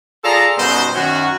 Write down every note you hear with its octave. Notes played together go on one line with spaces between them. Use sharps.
F4 G#4 A4 D5 A#5
F#2 B2 G3 B3 D#4 C5
F#2 D#3 C#4 F#4